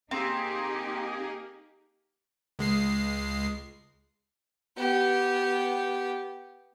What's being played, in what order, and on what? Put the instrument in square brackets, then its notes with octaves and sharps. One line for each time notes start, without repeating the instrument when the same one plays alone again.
[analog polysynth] A#3 G#4 [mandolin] C4 [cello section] D#4 G4
[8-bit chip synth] C#2 G#3 C7
[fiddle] B3 G4